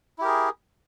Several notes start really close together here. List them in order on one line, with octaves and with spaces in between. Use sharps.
E4 G4 A#4 G#4